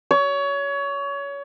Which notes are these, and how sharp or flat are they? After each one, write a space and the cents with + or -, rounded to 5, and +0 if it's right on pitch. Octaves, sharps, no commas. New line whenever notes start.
C#5 +25